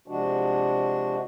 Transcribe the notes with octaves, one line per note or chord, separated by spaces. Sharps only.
C3 F3 G#3 D4 F#4